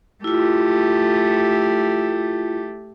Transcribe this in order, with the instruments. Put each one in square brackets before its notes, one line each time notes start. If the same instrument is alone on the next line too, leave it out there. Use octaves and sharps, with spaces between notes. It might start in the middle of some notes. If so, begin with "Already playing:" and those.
[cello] A3 G4 [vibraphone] E4 F4